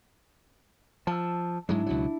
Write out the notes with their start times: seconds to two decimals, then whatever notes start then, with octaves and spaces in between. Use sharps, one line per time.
1.07 F3 A5 E6
1.69 G#2 F#3 G#3 D4 E4
1.86 C#2 B2 F#3